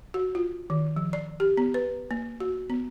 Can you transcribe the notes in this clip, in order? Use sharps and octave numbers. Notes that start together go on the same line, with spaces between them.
F#4
F4
D#3
F3
D5
G4
B3
B4
A#3
F#4
B3